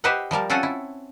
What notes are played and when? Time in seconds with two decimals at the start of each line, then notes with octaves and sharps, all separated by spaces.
0.04 G4 B4 C5 D#5 E5 F#5
0.31 F3 G3 A#4 A5
0.50 C4 C#4 F4 A4 F#5 G#5
0.63 E4